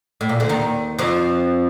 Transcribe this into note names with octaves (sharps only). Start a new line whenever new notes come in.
A2
A#2
D2 D3
D#2 D#3
F2 F3